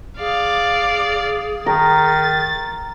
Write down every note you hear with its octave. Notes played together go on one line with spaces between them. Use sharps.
G#4 D5 F5
D#3 A#5 A6